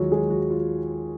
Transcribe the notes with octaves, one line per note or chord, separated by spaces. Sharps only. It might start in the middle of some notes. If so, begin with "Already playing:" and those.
Already playing: D#2 D#3 F#3 G#3 F4 F#4
G#3 G#4
F#3 F#4
F4